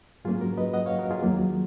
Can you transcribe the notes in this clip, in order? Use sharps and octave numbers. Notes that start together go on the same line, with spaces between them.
G#2 F#3 A#3 C#4 F4 G#4
F#4 A#4
B4 D#5
D#5 F#5
C#5 F5
F#4 A#4
F4 G#4
D#2 D#3 F#3 A#3